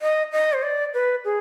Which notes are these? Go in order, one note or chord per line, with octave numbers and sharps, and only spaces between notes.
D#5
D#5
C5
D5
B4
G#4